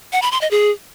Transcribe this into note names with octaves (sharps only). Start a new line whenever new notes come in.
F#5
B5
C6
D#5
G#4